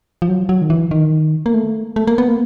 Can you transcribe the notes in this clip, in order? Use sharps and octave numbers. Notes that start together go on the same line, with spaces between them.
F3
F#3
F#3
D#3
E3
D#3
A#3
A3
A3
A#3
B3
A#3